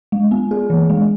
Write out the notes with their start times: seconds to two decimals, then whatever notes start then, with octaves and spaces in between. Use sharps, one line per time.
0.12 G#3
0.31 B3
0.51 G#4
0.70 E3
0.90 G#3